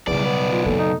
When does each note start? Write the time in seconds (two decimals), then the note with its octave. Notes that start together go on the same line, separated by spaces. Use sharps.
0.07 B1 E2 C#3 G3 D5
0.25 B3
0.53 F4
0.66 F#1 B2 A4
0.78 D#4